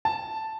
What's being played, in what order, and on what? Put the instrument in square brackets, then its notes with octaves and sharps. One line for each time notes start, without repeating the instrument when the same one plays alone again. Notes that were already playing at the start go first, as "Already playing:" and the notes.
[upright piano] A5